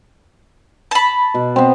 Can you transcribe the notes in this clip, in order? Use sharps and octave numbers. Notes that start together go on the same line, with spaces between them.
A5 B5
B2
B3 C4